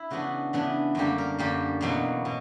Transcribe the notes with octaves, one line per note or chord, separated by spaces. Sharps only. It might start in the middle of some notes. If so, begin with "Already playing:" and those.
Already playing: E4
C#3 E3 B3 D4 F#4
C#3 E3 B3 D4
F#2 D3 G3 A#3 G4
A#4
F#2 D3 G3 A#3 G4
E2 B2 F#3 A#3
B2